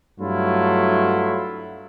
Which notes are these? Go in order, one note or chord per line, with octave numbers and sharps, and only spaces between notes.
G2 F#3 A3 E4 F4